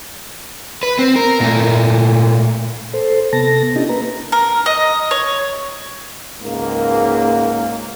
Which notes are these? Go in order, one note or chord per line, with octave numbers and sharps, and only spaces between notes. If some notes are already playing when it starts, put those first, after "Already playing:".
B4
C4
A#4
A#2 A3
A4 C5
C3 B3 A4 A5 A#6
C#4 D4 E4 G4 D#5
A#3 B4 A#5
A#4
D#5
C#5
C#2 G#2 A#3